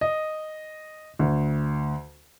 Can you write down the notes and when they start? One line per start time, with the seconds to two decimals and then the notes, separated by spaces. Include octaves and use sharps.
0.01 D#5
1.19 D2